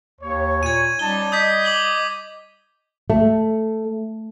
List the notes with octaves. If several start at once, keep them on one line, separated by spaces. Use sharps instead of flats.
D#2 C#5
A#2 G#6 D#7
G3 C#4 D#4 A5 G7
D#5 D#6 G6 B6
D6 F#7 G7
A3